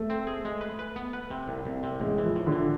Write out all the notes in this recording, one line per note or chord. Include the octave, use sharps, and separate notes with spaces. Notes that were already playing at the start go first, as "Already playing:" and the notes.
Already playing: A3
C4
G#4
G#3
B4
B4
B3
B4
C3
C2
C2
C3
A1 G#3
E3
F3
A2
D3
E3